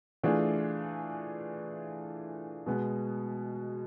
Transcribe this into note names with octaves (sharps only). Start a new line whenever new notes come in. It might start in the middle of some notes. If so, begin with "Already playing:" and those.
E3 A3 D4 F4 G#4
B2 G#3 B3